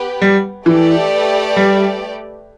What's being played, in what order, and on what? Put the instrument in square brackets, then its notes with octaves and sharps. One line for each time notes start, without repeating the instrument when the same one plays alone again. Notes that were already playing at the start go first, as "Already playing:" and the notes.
Already playing: [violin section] B3 G4 B4
[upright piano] G3
[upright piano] E3 [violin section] A3 G4 B4 D5
[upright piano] G3